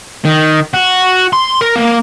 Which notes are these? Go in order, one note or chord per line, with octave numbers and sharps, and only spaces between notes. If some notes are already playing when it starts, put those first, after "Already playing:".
D#3
F#4
C6
A#4
A#3